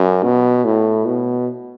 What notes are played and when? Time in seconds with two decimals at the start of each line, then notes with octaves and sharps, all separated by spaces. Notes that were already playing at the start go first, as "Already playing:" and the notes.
Already playing: F#2
0.23 B2
0.65 A2
1.06 B2